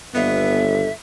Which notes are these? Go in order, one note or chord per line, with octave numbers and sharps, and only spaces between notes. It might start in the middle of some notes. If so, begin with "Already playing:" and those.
G1 D#2 D3 B3 E5 F5